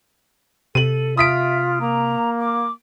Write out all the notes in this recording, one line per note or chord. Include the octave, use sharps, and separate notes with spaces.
C3 A4 D#7 F#7
F4 E5 D#6 B6 D7
A#3 A#5
D6